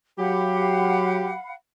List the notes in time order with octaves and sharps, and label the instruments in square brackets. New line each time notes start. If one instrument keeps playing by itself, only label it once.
[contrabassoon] F#3 [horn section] G4 [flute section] F5 F#5 B5